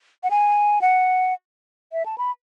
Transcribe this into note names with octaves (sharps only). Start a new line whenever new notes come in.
F#5
G#5
F#5
E5
A5
B5